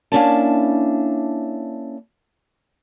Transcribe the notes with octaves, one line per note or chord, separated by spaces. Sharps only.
A#3 C#4 D4 E4 A5